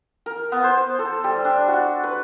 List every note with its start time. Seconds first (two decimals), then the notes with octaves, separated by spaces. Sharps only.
0.26 A#4
0.52 B3
0.64 C5
0.99 A4
1.24 G3
1.45 D4
1.68 F#4
2.04 B4